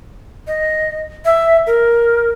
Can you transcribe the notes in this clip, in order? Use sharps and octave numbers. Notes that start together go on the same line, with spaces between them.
D#5
E5
A#4